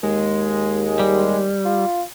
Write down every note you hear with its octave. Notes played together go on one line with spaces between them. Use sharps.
D#2 G#3
G3
F4